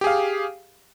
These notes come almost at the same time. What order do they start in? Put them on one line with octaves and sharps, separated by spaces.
G4 G#4 F5